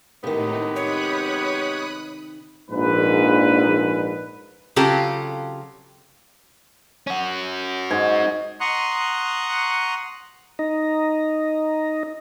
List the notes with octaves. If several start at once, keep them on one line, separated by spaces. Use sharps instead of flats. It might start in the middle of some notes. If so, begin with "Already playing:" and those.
A2 C3 D#3 G#3 B3 D#4 G4
C#5 B5 D#6 F#6
A#1 G#2 B4
C#3 F#3 C4 F4 G4 A4
C#4 F#4
G#2 G#5
F#5 A#5 C6 C#6 D#6 F#6
D#4 D#5 A#5